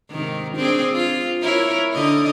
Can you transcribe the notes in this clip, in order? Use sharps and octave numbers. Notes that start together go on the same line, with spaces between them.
G#2 C3 D#3
C4 D4 G#4
F4
E4 A#4 C#5
D3 D#4 D#5